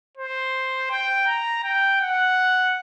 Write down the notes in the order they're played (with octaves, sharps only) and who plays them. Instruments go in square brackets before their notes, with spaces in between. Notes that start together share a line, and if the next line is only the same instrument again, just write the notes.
[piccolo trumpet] C5
G5
A#5
G5
F#5